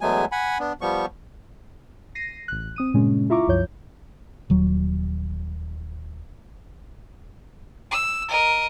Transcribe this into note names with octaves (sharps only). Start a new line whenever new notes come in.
E2 F#3 G#3 A3 B3 G#5
F#5 G#5 B5
B3 D4
F3 G3 B3 C#6
A#6 C7 D#7
A1 F#6
C4 D#6 D#7
G2 A#2 C#3 G#3 C#4
E4 F4 E5 A#5 C#6 D6
C2 F#2 F3 C#5 G6
D#1 F#3
E6
A#4 D#5